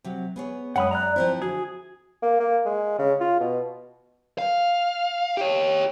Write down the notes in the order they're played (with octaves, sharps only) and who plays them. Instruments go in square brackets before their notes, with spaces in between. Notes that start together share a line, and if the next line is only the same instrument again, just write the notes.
[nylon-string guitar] C3 F#3
B3 G#4 C#5
[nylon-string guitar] F#2 G#3 C#4 [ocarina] C#5 [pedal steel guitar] F#5 B5 D#6
[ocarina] D5 [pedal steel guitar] A#5 F#6
[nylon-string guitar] F3 C4 E4 [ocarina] C5
[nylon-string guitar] D3 [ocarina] F#4 [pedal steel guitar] G#4
[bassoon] A#3
A#3
G#3
C#3
F4
B2
[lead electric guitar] F5
G4 C#5